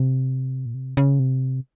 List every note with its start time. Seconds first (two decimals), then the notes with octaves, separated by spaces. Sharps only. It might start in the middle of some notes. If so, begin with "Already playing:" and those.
Already playing: C3
0.66 A#2
0.74 C3
0.97 C#3
1.19 C3